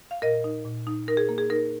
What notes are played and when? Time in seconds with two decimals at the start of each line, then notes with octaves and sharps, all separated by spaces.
0.11 F5
0.22 A#2 A#4 D#5
0.44 D#4
0.65 A#2
0.87 D#4
1.08 D#4 A#4
1.17 G#4
1.29 A#3
1.38 G#4
1.50 D#4 A#4